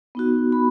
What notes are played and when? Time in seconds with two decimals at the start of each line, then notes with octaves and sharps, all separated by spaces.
0.15 B3 D#4 F#4
0.52 B5